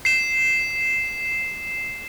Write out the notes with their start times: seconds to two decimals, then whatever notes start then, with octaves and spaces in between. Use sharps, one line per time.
0.05 C7 E7